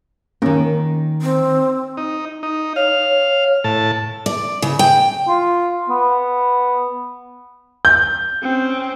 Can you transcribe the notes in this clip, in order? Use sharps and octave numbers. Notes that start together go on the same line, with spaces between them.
D#3 A#3 C#4 A#4
C4
D#4
D#4
C#5 F5
A2 A5
D5
C#3
G5
F4
B3
G6
C4 C#4